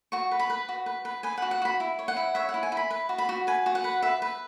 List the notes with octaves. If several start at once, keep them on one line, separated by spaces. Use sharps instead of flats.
F#4 C#6
B4
B5
B4
F#4
B4
B4
B4 G#5
F#5
F#4
F#5
F#4 B5
E4
C#5
F#5
E4
C#5 E5
F#5
E4
G#5
E4
B5
B4
F#4
B5
F#4
B4 G#5
F#4
F#5
B4
B4 E5
B4